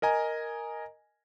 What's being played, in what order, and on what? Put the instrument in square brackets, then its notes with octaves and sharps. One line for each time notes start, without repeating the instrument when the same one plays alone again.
[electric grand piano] A#4 D#5 G#5 A#5